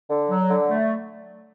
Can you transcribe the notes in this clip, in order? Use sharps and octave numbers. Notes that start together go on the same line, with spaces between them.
D3
F#3
D3
A3